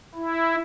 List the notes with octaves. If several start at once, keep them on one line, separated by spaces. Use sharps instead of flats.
E4